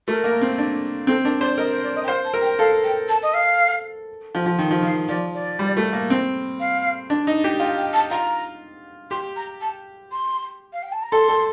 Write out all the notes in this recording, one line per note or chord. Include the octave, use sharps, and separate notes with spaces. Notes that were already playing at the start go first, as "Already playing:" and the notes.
A3 A#4
A#3
C4
D4
C4 A4
D4 A#4
C5 D5
A#4 D#5
C5
D5
D#5
G5
C5 F5
A5
A#4
G5
A4 F5
G5
A5
D#5
F5
F3
F3
D#3 G5
F3
D#3 F5
F3 D5
D5
G3
A3
A#3
C4
F5
D4
D#4
G4
F4 G5
G5
A5
F4 A#5
G4 C6
A#5
A5
C6
F5
G5
A5
A#5
A4 C6
A4